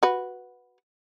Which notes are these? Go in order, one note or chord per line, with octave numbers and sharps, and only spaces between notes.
F#4 B4